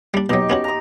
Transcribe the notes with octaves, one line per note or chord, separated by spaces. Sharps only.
G3 D4
B2 F#3 D#4 G4
B3 C#4 F#4
A#5 D#6